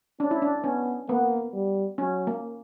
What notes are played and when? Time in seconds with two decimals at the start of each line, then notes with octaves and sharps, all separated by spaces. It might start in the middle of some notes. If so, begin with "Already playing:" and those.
0.20 C#4 D4
0.31 E4
0.42 D4
0.64 B3 C#4
1.09 A#3 B3
1.54 G3
1.98 F#3 C#4
2.27 A#3